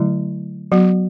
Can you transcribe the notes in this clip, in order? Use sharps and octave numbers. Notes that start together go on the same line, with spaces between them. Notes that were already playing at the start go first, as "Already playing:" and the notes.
Already playing: D3 F#3 A3 E4
F#3 B3 F#4